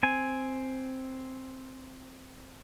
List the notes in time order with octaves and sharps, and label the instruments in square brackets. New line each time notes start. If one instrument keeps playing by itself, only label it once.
[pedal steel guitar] C4 G#5